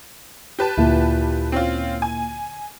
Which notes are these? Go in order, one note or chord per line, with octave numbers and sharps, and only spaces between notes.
G4 B4 A5
D2 A#2 E4
C4 C#4 F4
G#5